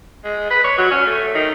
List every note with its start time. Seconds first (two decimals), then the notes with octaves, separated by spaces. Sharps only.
0.24 G#3
0.51 B4
0.64 C#5
0.78 F#3
0.91 C#4
1.06 A3
1.35 D#3